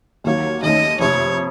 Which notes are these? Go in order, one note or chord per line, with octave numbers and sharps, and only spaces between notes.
D#2 D#3 F#3 A#3 C#5
D#2 D#3 A3 C#4 D#5
F#1 F2 C3 C#5